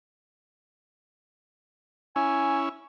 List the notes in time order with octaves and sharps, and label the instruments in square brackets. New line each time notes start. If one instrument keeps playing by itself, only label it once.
[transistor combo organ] C#4 E4 [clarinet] G#5